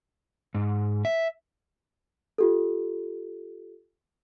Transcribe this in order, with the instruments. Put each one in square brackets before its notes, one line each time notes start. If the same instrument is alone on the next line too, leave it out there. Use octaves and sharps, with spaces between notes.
[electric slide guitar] G#2
E5
[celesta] F4 G4 A4